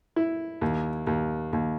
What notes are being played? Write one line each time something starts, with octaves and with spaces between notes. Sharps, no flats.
E4
D#2
D#2
D#2